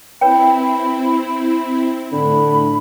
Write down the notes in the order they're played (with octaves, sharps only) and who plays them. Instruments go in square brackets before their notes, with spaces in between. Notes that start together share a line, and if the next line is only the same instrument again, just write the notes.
[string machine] C4 E4 [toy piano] B4 C#5 G5 [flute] B5
[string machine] A2 [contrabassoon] D3 [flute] B5